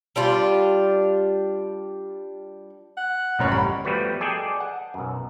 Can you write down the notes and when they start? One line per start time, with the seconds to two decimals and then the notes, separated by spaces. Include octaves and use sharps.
0.16 G3 D4 F4
2.97 F#5
3.39 A1 F#2 C#5
3.52 G3 B5
3.85 F3 G3 A3 B3 F#4 B4
4.21 G#4 A4 D5 D#5 G5 G#5
4.60 F#5
4.94 B1 F#2